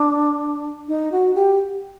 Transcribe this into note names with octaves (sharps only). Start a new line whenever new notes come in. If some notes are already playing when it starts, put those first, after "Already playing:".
Already playing: D4
D#4
F#4
G4